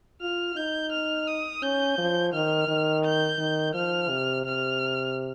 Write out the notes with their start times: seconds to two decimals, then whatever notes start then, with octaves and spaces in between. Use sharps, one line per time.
0.21 F4 F6
0.56 D#4 G6
0.92 F6
1.27 D#6
1.62 C#4 G6
1.98 F3
2.33 D#3 F6
2.68 D#3
3.04 G6
3.39 D#3
3.74 F3 F6
4.09 C3
4.45 C3 F6